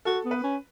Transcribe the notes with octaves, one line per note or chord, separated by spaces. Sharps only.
F#4 A4
B3
B4
C#4